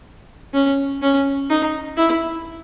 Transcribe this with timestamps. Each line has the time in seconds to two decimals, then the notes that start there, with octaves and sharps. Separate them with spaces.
0.54 C#4
1.02 C#4
1.50 D#4
1.97 E4